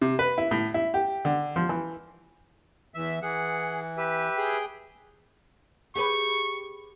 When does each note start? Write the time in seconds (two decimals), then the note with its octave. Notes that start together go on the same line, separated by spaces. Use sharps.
0.01 C3
0.19 B4
0.38 E4
0.51 A2
0.74 E4
0.94 G4
1.25 D3
1.56 F3
1.69 E3
2.94 E2 E3 E5
3.22 E3 G#4 F#5
3.97 G4 B4 E5
4.37 G#4 G5
5.95 G4 G#4 B4 C#6